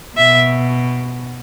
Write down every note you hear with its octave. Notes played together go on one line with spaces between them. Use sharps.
B2 E5